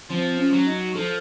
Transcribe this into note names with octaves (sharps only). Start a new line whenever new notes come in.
F3 C4
C#4
F#3
D#4
F3 A4